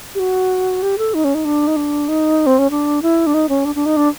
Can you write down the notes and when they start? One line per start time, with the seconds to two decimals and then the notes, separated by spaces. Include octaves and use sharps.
0.15 G4
0.19 F#4
0.82 G4
0.98 A4
1.14 D#4
1.24 C#4
1.35 D#4
1.45 D4
1.67 D#4
1.76 D4
2.08 D#4
2.46 C4
2.59 C#4
2.71 D4
3.02 E4
3.27 D4
3.34 D#4
3.49 C#4
3.65 D4
3.75 D4
3.86 D#4
3.97 D4